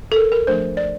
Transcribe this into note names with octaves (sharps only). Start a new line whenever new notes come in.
A4
A#4
A#4
F3 A3 D4 C5
D5